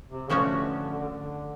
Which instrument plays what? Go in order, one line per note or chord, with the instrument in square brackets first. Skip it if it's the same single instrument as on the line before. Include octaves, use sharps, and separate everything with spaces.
[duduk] C3
[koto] A2 F3 A3 C#4 F#4 [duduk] D3
[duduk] D3